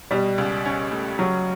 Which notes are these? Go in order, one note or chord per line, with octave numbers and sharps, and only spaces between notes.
B2 G3
C#2
C#4
A3
C#3 F#3